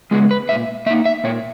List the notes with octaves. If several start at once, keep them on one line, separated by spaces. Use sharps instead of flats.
C#3 G#3 B3 G#4
B4
A#2 E5
A#3 D#4 E5
E5
A#2 C#5